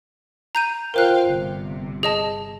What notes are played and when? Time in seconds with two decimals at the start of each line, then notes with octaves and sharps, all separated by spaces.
0.55 A#5 G6 D#7
0.94 F4 A#4 C5 F5 G5 F#6
1.27 G1 C3
2.03 G#4 D#5 A5